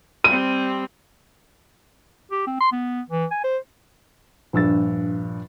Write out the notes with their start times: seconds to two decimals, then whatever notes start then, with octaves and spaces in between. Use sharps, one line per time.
0.24 G3 C4 D#7
2.31 G4
2.47 C4
2.60 C6
2.72 B3
3.10 E3
3.31 G#5
3.44 C5
4.53 A#1 G2 E6 A6